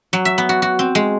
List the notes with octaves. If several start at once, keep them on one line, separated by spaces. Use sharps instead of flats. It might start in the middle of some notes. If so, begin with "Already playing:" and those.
F#3
E5
B3
F#4
F#4
C4
G#3